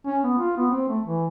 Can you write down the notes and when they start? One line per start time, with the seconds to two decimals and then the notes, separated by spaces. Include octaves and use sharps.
0.06 C#4
0.24 B3
0.38 F4
0.57 B3
0.71 C4
0.89 A3
1.04 E3